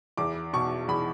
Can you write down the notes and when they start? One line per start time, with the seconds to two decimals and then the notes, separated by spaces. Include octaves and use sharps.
0.17 E2 D6
0.53 B2 C#6
0.88 E2 B5